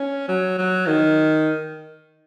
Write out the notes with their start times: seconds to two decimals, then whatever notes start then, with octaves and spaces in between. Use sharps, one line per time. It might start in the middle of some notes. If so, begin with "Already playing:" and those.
Already playing: C#4
0.28 F#3
0.58 F#3
0.87 D#3